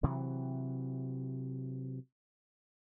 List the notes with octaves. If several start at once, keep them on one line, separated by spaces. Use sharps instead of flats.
C3 E3 F#3